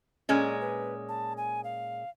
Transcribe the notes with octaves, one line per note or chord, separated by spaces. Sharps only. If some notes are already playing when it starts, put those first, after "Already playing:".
A#2 G#3 C#4 D5
B4
A5
G#5
F5